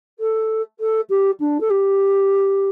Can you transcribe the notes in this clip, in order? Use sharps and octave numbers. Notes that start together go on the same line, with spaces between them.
A4
A4
G4
D4
A4
G4